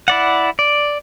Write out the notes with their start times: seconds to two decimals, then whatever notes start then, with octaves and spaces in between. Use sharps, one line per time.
0.08 E4 D5 F#5
0.59 D5